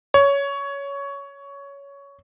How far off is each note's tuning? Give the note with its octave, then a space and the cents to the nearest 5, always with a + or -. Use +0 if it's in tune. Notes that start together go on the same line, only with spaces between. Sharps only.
C#5 +15